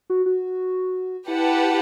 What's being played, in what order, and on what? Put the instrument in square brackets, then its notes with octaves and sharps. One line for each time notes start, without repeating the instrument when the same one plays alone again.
[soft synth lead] F#4
F#4
[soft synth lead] E4 [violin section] G4 B4 F#5 A5